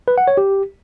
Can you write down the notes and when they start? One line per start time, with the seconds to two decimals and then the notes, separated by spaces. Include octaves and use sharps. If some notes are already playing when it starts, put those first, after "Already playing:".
0.08 B4
0.18 F#5
0.28 C#5
0.37 G4